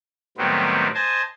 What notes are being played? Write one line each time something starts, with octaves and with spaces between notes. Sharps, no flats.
A2 D#3 F#3 G3 B3 C4
C5 D#5 G#5 A5